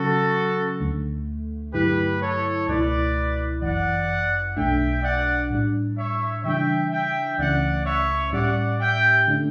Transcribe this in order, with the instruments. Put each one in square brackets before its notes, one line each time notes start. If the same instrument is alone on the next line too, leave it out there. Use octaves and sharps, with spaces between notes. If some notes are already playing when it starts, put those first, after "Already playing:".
Already playing: [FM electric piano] C#3 F#3 C#4 [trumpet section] F#4 A4
[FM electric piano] D2 D3 A3
[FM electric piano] G2 D3 F#3 A3 E4 [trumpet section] G4 B4
[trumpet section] A4 C#5
[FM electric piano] C#2 B2 A3 E4 [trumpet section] B4 D5
[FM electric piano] G1 F#2 E3 [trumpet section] D5 F#5
[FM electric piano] B1 B2 A3 D4 [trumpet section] E5 G5
[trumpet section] D5 F#5
[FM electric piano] A2 G3 D4
[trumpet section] C#5 E5
[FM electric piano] C#3 E3 G3 D4 [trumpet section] E5 G5
[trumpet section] E5 G5
[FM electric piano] C#2 C#3 E3 A3 C#4 [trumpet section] D5 F#5
[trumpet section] C#5 E5
[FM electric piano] A2 G3 C#4 G4 [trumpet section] D5 F#5
[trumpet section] E5 G5
[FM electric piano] D3 A3 D4